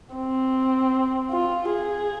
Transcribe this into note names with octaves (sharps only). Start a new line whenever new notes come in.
C4
F4
G#4